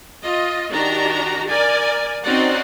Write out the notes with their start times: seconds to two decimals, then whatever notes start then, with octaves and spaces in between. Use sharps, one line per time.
0.23 F4 D#5
0.70 D#3 D4 F#4 G4 A#5
1.49 A#4 D5 G#5
2.23 C4 C#4 D#4 F#4 D5 F#5